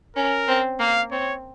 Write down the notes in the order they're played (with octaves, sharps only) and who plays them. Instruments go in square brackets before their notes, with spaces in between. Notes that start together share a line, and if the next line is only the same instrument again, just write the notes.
[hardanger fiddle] C#4 [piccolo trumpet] A#4
[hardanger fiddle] C4
[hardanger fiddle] A#3 [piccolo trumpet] F5
[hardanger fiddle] C4 [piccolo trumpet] C#5